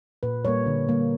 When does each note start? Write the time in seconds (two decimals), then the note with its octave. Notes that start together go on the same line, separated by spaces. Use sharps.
0.23 A#2 B4
0.45 G3 A#3 C#5
0.66 D3
0.89 G3 A#3